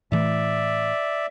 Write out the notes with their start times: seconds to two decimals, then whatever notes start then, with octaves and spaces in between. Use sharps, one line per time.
0.12 A2 E3 A3 D5 E5